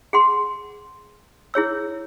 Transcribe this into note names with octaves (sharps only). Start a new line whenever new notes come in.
G#4 F#5 C6
E4 G#4 C#5 E6